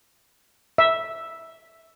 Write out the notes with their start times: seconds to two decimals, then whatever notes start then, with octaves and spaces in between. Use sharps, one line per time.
0.78 E5